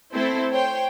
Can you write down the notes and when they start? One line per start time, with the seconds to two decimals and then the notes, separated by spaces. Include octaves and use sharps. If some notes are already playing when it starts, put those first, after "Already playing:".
0.14 A3 C4 E4 A4 C5
0.53 C5 C#5 G5